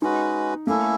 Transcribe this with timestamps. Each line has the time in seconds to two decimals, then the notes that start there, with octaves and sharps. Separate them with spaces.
0.02 G#3 C#4 D#4 F#4 B4
0.67 A3 A#3 C#4 E4 A4